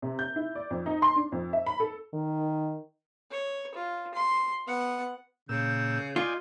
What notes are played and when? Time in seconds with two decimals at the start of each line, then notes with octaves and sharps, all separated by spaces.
0.02 C3
0.19 G6
0.36 E4
0.55 D5
0.71 F2
0.86 D#4
1.02 C6
1.16 D4
1.32 F2
1.53 E5
1.66 B5
1.80 A4
2.13 D#3
3.31 C#5
3.75 F4
4.14 C6
4.66 B3 F#5
5.49 A#2 C#3 E6 G6
6.16 F4 D5 D#5 G#5